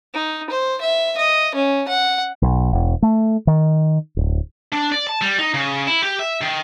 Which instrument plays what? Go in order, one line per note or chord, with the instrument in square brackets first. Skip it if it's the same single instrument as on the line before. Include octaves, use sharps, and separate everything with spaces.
[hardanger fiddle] D#4
C5
E5
D#5
C#4
F#5
[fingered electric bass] B1
E1
A3
D#3
D1
[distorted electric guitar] D4
D5
A5
G3
D#4
C#3
E4
G4
E5
D#3